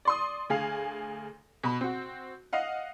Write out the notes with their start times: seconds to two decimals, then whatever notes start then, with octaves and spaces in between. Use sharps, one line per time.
0.05 D5 C6 D#6
0.50 D2 G#4 F5
1.63 B2 B5
1.81 C4 F#4
2.53 D#5 F5 F#5